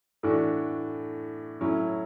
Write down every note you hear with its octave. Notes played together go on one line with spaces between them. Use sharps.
A2 E3 A3 D4 F#4
A2 F#3 C#4 E4